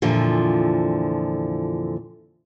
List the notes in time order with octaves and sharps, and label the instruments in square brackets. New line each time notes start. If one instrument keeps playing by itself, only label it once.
[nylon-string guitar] F2 A#2 D3 E3 F3